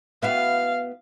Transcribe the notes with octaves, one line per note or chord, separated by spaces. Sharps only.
B3 E4 F#4 F5